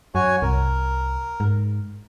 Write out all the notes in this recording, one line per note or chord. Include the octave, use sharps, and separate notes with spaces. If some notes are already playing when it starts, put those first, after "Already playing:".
F#2 F#4 C#5 G#5
C2 A#4
G#2